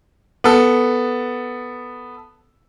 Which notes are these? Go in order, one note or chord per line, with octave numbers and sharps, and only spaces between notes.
B3 A4